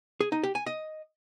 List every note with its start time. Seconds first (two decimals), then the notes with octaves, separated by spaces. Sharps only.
0.21 G#4
0.32 D#4
0.43 G4
0.55 G#5
0.66 D#5